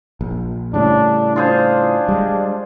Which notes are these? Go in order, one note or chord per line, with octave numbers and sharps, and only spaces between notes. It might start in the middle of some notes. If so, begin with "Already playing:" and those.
A#1
A2 C#3 G3 D4
D4 F4 G#4 C5
G3 G#3